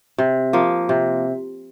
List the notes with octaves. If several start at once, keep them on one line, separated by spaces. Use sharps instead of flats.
C3
F3 A#3
C3